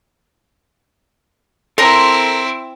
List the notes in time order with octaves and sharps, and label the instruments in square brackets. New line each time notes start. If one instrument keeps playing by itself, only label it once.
[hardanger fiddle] C4 E4 [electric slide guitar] A4 A#5 [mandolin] A#4 C6